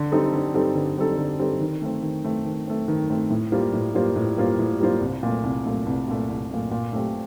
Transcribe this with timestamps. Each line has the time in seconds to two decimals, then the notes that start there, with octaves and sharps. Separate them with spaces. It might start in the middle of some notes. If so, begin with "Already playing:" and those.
Already playing: D3
0.12 G3 C4 D#4 A4
0.32 D3
0.54 G3 C4 D#4 A4
0.75 D3
0.97 G3 C4 D#4 A4
1.18 D3
1.39 G3 C4 D#4 A4
1.60 D#3
1.82 A3 C4
2.03 D#3
2.24 A3 C4
2.45 D#3
2.67 A3 C4
2.88 D#3
3.10 A3 C4
3.30 A2
3.52 G3 A#3 F4 C5
3.73 A2
3.94 G3 A#3 F4 C5
4.16 A2
4.37 G3 A#3 F4 C5
4.59 A2
4.80 G3 A#3 F4 C5
5.01 C2
5.23 A#2 A3
5.44 C2
5.65 A#2 A3
5.86 C2
6.07 A#2 A3
6.29 C2
6.51 A#2 A3
6.71 A#2
6.93 A3 C4 G4